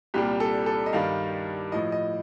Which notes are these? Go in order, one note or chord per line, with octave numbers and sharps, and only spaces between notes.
C2 A#2 G3 G4
A4
A4
D#5
G2 D#3 G3 F5
A2 F3 D#5
D#5